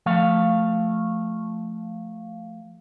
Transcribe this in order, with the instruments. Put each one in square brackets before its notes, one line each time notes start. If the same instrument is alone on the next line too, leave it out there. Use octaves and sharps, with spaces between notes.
[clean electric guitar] F3 A3 F5